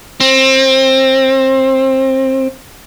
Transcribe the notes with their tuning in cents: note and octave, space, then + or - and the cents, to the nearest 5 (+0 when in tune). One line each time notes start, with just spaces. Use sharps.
C4 +20